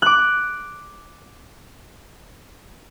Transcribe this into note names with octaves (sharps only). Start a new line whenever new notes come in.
D6 F#6